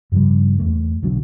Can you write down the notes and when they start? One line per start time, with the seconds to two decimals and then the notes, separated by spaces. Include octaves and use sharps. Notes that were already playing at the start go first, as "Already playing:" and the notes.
0.12 G2 C#3 F3 G3
0.58 E2 A3 A#3
1.03 B1 B2 D3 F#3